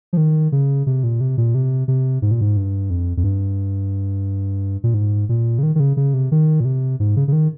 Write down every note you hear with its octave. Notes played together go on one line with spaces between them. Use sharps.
F3
D#3
C#3
C3
A#2
C3
A#2
C3
C3
G#2
A#2
G#2
G2
F2
F2
G2
A#2
G#2
A#2
C#3
D#3
D#3
C#3
C#3
C3
D#3
A#2
C3
G#2
C#3
C#3
D#3